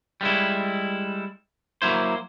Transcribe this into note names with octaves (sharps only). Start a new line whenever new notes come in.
G3 G#3 E4
F#3 A#3 E4 C5